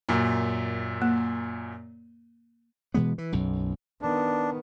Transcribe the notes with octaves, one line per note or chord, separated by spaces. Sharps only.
F#2 A#2
A#3
B2 E3 G#3 B3
E3
B1 F#2
D#3 B3 D4